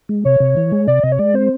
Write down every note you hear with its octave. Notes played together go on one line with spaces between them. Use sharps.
G#3
C3 C#5
C3
E3
G#3
C3 D5
C3 D#5
C#5
G#3 D5
C4 C5